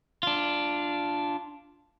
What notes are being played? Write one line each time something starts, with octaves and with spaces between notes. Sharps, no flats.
D4 F4